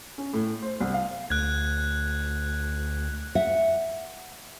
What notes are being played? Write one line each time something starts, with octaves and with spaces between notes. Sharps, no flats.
C#4
A2
C5
C2
F5
D2 F#6 G#6
E5 F#5